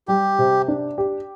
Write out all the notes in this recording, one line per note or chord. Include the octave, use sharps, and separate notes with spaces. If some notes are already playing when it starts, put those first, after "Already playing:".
G3 G4
C3
D4
G4